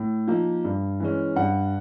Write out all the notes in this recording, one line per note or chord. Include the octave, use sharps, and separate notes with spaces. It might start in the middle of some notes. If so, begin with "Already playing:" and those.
Already playing: A2
F3 A#3 D#4
G2
E3 G#3 C#4
G2 F#5